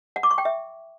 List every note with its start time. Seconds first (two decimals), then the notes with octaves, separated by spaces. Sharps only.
0.16 F#5
0.23 D6
0.31 C#6
0.38 G5
0.45 E5